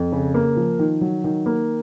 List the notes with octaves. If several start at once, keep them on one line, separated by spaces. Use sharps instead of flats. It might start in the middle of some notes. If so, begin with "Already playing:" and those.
Already playing: F2
C#3
A#3
F3
D#3
F#3
D#3
A#3